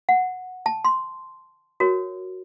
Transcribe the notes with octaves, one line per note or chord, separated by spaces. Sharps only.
F#5
A5
C6
F#4 A#4 C#5